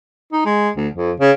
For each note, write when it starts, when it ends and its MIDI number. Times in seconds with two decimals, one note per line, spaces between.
0.33 0.45 63
0.45 0.69 56
0.76 0.88 38
0.95 1.11 41
1.20 1.31 49